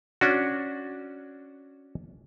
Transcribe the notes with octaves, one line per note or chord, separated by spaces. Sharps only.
C#4 D4 F#4